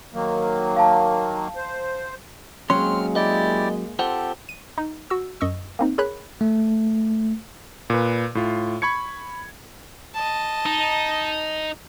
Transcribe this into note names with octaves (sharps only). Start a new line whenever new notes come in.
D#3 F#3 A#3
F5 A5
C5
F#3 G#3 A#3 C4 C#4 C6 F6
E4 G4 D5 D#5
C4 F4 G4 A4 C5 F#5
D#7
D#4
F#4 E6
F#2 D#5 C#6 E6
A#3 C4 D#4
G#4 A#4 C#5 B5 F#6
A3
A#2 B4
A2 F4
B5 C#6 G#6 C#7
D#5 A5
D#4